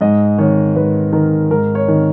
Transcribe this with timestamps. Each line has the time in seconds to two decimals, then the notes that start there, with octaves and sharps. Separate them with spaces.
0.01 G#2 D#5
0.38 D#3 C#5
0.76 G#2 B4
1.12 D#3 A#4
1.50 G#2 A#4
1.75 C#5
1.88 D#3